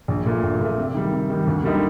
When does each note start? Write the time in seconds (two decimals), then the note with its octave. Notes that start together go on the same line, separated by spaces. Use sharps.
0.08 A#1
0.26 A#2 A3
0.43 A#1
0.60 A#2 A3
0.78 C3
0.94 D#3 G3
1.12 C3
1.30 D#3 G3
1.47 D2
1.63 D3 G3 A#3 D#4